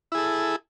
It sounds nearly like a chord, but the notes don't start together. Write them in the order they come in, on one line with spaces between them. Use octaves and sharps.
E4 G#4 A4